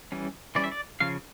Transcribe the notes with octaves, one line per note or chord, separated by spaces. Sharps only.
E3 G3 C#4
E3 G3 C#4 D5
E5
D5
C#3 F3 C#4 F5